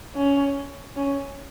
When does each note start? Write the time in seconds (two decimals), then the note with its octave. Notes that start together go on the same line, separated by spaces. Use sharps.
0.16 C#4
0.97 C#4